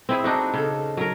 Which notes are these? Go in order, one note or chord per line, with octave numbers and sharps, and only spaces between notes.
C4 E4 G#4
D4 D#4 F#4
C#3 A4
F#3 A#4